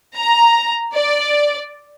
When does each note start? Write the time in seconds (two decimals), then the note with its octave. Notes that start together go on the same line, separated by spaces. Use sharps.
0.16 A#5
0.93 D5